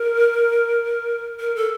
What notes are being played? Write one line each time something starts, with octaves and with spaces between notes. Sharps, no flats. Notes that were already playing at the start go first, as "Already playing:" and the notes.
Already playing: A#4
A#4
A4